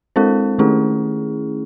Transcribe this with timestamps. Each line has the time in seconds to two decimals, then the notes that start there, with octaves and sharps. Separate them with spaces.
0.16 G#3 C4 E4 A4 C5
0.59 D#3 A3 C#4 E4 G#4